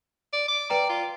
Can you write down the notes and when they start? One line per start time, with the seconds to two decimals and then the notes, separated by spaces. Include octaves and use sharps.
0.33 D5
0.48 D6
0.70 B4 D5 G5 A#5
0.89 F4